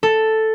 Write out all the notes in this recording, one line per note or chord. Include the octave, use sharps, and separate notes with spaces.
A4